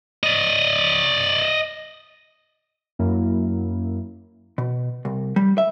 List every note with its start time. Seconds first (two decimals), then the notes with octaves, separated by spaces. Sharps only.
0.23 D5 D#5
2.99 F#2 A#3 E4
4.58 B2
5.05 C2
5.36 G3
5.58 E5